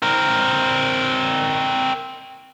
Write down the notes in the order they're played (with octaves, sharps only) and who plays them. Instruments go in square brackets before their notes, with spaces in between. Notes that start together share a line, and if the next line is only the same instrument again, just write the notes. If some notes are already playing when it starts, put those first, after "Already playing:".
[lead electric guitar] C4 A#4